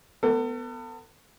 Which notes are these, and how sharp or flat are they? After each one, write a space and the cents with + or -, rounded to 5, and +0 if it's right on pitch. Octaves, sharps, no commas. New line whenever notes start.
B3 +10 A4 +40